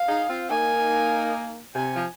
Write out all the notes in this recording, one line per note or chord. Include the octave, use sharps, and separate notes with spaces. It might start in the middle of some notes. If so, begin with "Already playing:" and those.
Already playing: F5
D#4 G#4
C4 F4
A#3 D#4 G#5
C3 G#5
F3